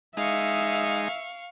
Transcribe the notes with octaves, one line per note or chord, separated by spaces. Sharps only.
G#3 D#4 E5 F5 C#6